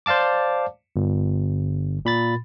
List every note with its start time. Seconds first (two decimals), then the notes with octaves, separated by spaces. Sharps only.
0.06 C5 D5 F5 A5 D6
0.96 G1
2.05 A#2 B5 A6